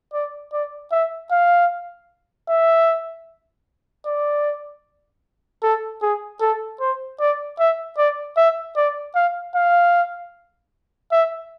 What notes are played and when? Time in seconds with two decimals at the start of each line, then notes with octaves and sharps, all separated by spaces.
0.13 D5
0.53 D5
0.92 E5
1.31 F5
2.49 E5
4.06 D5
5.63 A4
6.02 G#4
6.41 A4
6.80 C5
7.20 D5
7.59 E5
7.98 D5
8.37 E5
8.76 D5
9.15 F5
9.55 F5
11.12 E5